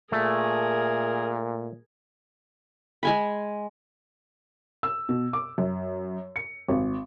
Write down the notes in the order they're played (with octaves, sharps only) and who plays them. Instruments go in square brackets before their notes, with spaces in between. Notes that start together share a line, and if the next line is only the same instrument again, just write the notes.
[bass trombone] A#2 [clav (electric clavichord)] A3 [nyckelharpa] G#4 A#4
[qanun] G#3 G#5 B5
[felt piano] E6
B2
D6
F#2
C#7
G#1